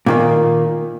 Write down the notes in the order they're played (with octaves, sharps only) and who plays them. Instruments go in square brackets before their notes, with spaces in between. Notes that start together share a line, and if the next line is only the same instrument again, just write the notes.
[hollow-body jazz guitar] A#2 D#3 A#3